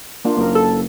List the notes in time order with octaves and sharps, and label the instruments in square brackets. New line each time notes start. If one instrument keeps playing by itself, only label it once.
[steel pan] A#3 D4 F4
[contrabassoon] F#1 [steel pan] A#3 A#4
[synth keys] A4